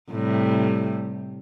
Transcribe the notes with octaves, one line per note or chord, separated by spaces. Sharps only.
A2 C3 G3